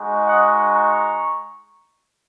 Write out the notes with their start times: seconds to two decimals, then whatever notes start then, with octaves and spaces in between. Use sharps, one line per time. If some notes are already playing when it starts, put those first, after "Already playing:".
Already playing: G#3 D#4 F#4
0.26 D#5 F#5
0.72 A#5 C#6